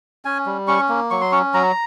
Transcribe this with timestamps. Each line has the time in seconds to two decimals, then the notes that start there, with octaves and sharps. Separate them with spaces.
0.25 C#4 G#5
0.46 G3
0.68 C#4 C#6
0.89 A#3
1.10 F#3 C#6
1.21 C6
1.32 C#4 C#6
1.54 F#3 A#5